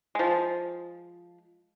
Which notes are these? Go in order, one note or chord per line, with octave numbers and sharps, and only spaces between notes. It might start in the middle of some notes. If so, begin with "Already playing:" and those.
F3 G#3